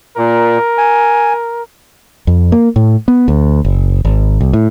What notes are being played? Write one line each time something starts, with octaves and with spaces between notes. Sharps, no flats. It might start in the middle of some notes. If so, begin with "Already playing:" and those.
A#2 A#4
G#5
F2
A#3
A2
B3
D2
F#1
G#1
C2
A2